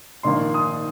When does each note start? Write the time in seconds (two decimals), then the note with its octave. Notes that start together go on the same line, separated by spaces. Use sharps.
0.23 A#1 G#2 D#3 A#3 D#4 C6
0.54 D#6